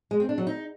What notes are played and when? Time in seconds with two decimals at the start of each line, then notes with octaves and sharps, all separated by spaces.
0.11 G#3
0.20 C4
0.29 D4
0.38 F#3
0.47 D#4